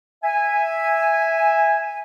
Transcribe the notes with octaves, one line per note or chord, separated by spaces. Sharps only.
E5 G#5